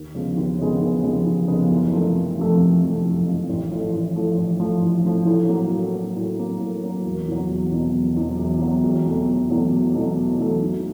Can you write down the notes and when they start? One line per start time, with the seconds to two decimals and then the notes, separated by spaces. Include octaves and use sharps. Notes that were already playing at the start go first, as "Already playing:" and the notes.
Already playing: D#2
0.15 C#3 F3 G#3 B3
0.37 D#2
0.59 C#3 F3 G#3 B3
0.82 D#2
1.04 C#3 F3 G#3 B3
1.26 D#2
1.48 C#3 F3 G#3 B3
1.71 F#1
1.93 F2 C3 F3 A3
2.15 F#1
2.37 F2 C3 F3 A3
2.60 F#1
2.82 F2 C3 F3 A3
3.05 F#1
3.26 F2 C3 F3 A3
3.49 A1
3.71 A2 F3 A3
3.93 A1
4.16 A2 F3 A3
4.38 A1
4.60 A2 F3 A3
4.82 A1
5.05 A2 F3 A3
5.27 A2
5.49 F#3 A#3
5.71 A2
5.93 F#3 A#3
6.17 A2
6.39 F#3 A#3
6.60 A2
6.83 F#3 A#3
7.05 E1
7.28 E2 B2 F#3
7.49 E1
7.71 E2 B2 F#3
7.95 E1
8.16 E2 B2 F#3
8.39 E1
8.61 E2 B2 F#3
8.83 E1
9.05 E2 B2 F#3 A3
9.28 E1
9.50 E2 B2 F#3 A3
9.72 E1
9.94 E2 B2 F#3 A3
10.17 E1
10.39 E2 B2 F#3 A3
10.62 G#2